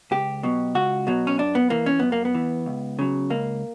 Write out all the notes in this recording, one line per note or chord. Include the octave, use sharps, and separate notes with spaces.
C#2 G4
B2 F#3
C#2 F#4
B2 F#3
C#4
F#2 D4
B3
E3 A#3
C#4
F#2 B3
A#3
B3
E3
C#2
C#3 F#3
C#2 A#3